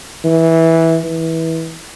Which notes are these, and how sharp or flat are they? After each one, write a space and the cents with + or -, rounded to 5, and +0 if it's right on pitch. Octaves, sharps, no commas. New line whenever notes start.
E3 -10
E3 -20